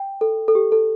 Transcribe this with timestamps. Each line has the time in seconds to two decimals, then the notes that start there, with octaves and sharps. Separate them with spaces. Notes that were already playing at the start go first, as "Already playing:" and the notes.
Already playing: G5
0.21 A4
0.48 A4
0.55 G4
0.72 A4